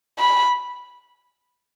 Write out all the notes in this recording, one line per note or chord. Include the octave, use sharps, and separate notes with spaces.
B5